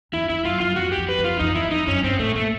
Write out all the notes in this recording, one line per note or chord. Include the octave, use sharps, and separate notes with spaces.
E2 E4
F2 E4
F#2 F4
F#2 F4
F2 F#4
G4
F2
B4
F2
F4
F2 D#4
E2 E4
F2 D#4
F#2 C#4
G2 C4
A2 A3
A#2 A3